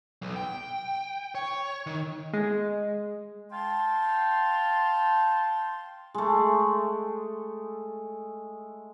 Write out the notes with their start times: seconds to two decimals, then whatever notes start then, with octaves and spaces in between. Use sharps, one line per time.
0.22 B1
0.36 G5
1.35 C#5
1.86 D#3
2.33 G#3
3.50 F5 G5 A5 C6
6.14 G#3 A3